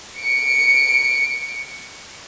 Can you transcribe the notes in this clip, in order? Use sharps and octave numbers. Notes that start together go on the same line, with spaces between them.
C#7 D7